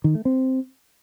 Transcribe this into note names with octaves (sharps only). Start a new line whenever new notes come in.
D#3
A3
C4